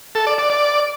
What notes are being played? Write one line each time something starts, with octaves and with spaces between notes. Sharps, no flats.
A4
D5
D5
D5